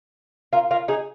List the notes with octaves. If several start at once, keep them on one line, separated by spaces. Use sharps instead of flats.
F4 A#4
F4 A#4
D#4 G#4